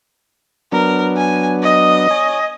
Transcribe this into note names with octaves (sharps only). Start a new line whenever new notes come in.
F#3 B3 D4 A#4
G#5
D#5
C#5 G#5